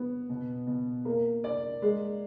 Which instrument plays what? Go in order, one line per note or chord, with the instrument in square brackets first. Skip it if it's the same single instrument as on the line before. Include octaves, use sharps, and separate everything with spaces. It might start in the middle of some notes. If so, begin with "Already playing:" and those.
Already playing: [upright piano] B3
B2
B2
A#3
D5
G#3